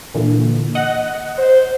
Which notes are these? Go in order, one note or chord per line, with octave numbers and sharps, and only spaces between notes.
A#2 D3 E3
D#5 F#5
C5